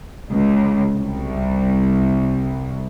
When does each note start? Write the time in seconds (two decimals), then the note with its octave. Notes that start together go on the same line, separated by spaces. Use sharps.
0.32 C#2
0.96 C2